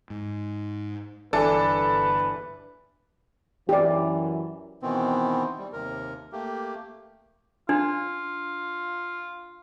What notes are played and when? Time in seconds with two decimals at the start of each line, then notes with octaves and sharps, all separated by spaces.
0.10 G#2
1.33 G1 E3 D4 A4 B4
3.69 F#2 E3 G4 D5
4.82 B2 D#3 E3 B3 C4
5.59 G3
5.73 D#2 C3 A#4
6.32 A3 A#3 G4
7.69 D4 F4